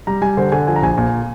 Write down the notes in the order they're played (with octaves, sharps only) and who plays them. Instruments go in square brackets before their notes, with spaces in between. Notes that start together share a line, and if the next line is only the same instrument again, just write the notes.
[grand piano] G3 A#5
G3 G#5
D3 C5
D3 G#5
F3 G#5
A#5
A#1 G#5
A#2 G#5